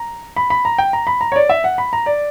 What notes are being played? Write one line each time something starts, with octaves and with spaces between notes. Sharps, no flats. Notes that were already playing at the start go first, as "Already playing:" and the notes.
Already playing: A#5
B5
B5
A#5
G5
A#5
B5
A#5
C#5
D5
E5
F#5
B5
A#5
D5